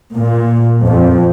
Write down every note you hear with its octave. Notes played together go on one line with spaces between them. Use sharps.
A#2
F2